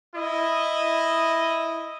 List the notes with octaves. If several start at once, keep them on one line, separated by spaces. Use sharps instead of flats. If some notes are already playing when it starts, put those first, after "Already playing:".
E4 D#5